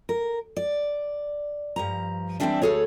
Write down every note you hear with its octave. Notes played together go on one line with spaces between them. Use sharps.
A#4
D5
G2 F3 A#5
E3 F#3 G3 C4 D4 E5
D2 A3 G#4 A4 C#5